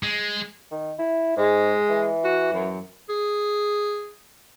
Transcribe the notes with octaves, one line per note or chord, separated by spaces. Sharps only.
G#3
D#3
E4
G#2 G#3
E3
F#4
F#2
G#4